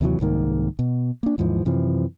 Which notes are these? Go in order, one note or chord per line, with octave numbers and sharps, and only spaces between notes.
D#2 C3 E3 F#3
C2 G#2 D#3 A#3
B2
A#3 D4
D#2 G#2 E3 F3
F#2 C3 E3 F3